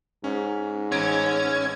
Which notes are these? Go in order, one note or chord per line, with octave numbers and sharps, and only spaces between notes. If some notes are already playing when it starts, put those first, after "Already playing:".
G#2 C#4
A1 C#4 G#6 D7